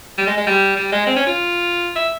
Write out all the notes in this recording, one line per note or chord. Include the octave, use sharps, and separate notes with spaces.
G3
G#3
G#3
G3
G3
G#3
C4
C#4
F4
E5